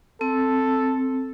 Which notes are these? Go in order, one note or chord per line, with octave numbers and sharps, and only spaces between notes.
C4 A4